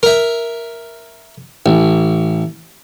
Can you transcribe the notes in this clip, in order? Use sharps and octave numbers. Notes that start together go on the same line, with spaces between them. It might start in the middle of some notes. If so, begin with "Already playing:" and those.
A#4 E5
A1